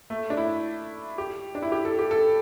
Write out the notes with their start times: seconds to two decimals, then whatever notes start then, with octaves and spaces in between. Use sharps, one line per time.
0.10 A3
0.30 D4
0.37 E4
1.18 G4
1.55 D4
1.62 E4
1.72 G4
1.85 A4
1.99 G4
2.11 A4